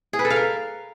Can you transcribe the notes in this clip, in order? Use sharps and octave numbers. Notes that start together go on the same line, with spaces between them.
G#4
B4
A4
F5
A#4